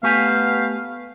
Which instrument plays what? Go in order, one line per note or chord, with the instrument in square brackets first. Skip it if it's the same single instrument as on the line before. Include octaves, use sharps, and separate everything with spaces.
[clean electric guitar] A3 G4 G#5 [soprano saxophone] B3 [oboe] F5